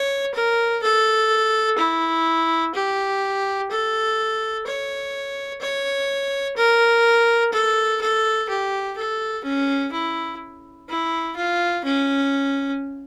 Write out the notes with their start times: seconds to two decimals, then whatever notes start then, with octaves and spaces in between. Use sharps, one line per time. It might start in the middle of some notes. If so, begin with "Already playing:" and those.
Already playing: C#5
0.35 A#4
0.83 A4
1.78 E4
2.74 G4
3.71 A4
4.66 C#5
5.61 C#5
6.57 A#4
7.53 A4
8.01 A4
8.49 G4
8.97 A4
9.44 C#4
9.92 E4
10.89 E4
11.36 F4
11.84 C#4